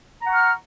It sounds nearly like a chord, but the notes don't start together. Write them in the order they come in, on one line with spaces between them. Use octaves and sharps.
A#5 F#5 C#6 F6